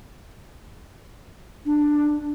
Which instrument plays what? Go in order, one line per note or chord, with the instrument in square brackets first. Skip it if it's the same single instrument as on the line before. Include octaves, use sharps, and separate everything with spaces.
[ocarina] D4